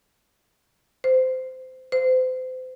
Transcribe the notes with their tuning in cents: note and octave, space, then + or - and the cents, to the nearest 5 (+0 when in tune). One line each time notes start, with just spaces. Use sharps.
C5 -20
C5 -35